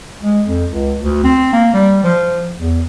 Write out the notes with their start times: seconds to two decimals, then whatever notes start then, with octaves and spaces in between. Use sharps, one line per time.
0.21 G#3
0.46 F2
0.71 C#2
1.02 D2
1.24 C4
1.53 A#3
1.73 G3
2.04 F3
2.58 E2